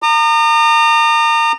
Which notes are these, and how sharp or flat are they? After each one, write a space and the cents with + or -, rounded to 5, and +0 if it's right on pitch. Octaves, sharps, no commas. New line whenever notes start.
A#5 -25 D#6 -45